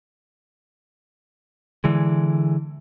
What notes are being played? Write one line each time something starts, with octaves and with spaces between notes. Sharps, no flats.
D3 E3 G#3